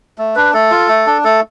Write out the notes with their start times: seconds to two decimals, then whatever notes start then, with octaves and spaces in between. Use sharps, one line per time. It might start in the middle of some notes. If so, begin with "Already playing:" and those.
0.18 A3
0.35 D4 B4
0.54 A3 A4
0.71 F4
0.89 A3
1.07 D4
1.24 A3 A4